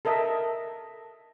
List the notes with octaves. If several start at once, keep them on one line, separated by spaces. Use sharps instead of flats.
A4 A#4 D#5 E5